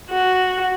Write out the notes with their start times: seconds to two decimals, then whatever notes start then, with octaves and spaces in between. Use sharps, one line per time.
0.10 F#4